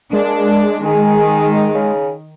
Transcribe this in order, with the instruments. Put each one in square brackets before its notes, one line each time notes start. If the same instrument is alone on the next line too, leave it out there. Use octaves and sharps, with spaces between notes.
[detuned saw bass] G#3 [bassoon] A#3 [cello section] D4
[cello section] D#3 [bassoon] G#4
[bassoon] C#3